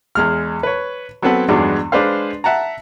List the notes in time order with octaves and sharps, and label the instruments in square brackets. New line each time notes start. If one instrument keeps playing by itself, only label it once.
[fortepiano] E2 G#3 F6
B4 C#5
F#3 B3 C4 A4 B4 F#5
E2 G2 F#3 G#3 B3 D4
G#3 D4 B4 C5 F5
E5 F#5 A5 A#5